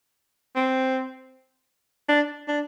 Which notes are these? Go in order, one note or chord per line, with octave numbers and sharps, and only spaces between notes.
C4
D4
D4